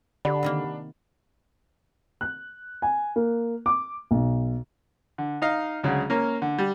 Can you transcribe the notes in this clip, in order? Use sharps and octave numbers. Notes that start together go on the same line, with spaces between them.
D3 D4 G4 F#5 B5
C3 D#3 A#3
F#6
G#5
A#3
D6
B1
D3
D#4 D#5 F5
D2 C#3 F#3 G#3
A#3 C#4 A#4
D3
G3